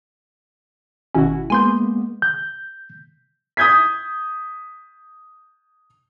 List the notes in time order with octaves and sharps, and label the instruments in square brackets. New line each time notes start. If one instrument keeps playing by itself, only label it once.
[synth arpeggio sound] G#1 B2 C#4 [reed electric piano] E4 F#4
[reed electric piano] G#3 A#3 B3 [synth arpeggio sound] G#5 C6 G6
[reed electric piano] G6
[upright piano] D#6 G6 G#6 B6